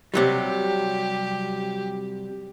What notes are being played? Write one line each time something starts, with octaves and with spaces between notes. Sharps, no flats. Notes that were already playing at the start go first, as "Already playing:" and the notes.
C3 F#3 G3 G4